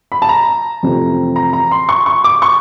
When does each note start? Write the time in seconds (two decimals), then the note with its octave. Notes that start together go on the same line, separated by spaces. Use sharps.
0.12 B5
0.22 A5
0.29 A#5
0.83 F2 C3 E3 A3 C4
1.36 A#5
1.53 A#5
1.71 C6
1.89 C#6
2.06 C#6
2.24 D6
2.42 C#6